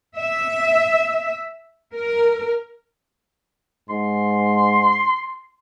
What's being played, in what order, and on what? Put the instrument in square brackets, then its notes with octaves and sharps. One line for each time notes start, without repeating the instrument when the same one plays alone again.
[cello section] E5
A#4
[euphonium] G#2 [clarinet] C6